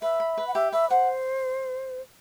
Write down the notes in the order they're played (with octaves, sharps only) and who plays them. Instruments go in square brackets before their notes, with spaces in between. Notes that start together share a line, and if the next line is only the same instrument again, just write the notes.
[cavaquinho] B4 [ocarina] E5
[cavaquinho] B5
B4
[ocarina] F#5
[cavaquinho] G4 [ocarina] E5
[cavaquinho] B4 [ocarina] E5
[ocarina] C5 [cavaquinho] F#5